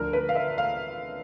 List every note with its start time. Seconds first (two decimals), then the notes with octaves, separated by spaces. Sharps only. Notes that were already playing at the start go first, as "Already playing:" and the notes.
Already playing: D2 D3 F3 A#4
0.13 B4
0.29 F5
0.35 E5
0.58 F5